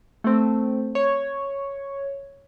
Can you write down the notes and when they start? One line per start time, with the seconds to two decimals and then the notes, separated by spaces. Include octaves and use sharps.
0.24 A3 C4
0.95 C#5